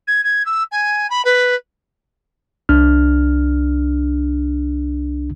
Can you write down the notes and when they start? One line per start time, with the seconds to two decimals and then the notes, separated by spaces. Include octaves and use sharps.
0.07 G#6
0.24 G#6
0.45 E6
0.71 G#5
1.10 B5
1.24 B4
2.69 C2 D4 F6